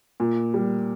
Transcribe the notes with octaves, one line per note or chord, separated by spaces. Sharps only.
A#2
G3